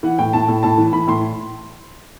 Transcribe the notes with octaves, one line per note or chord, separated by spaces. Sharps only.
E3 F#5
A2 G5
A2 A5
A2
A2 A5
E3
E3 B5
A2 C6